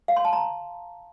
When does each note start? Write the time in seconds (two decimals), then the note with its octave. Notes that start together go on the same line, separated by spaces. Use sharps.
0.08 F5
0.17 C6
0.25 A5
0.33 A#5